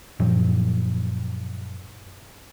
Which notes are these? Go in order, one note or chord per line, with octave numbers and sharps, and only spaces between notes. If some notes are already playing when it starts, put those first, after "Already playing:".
F#2 A#2 F3 F#3